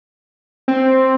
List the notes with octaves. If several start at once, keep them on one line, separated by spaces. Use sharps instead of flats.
C4